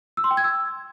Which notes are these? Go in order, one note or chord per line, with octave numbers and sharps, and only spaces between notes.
E6
C6
G5
G#6
E6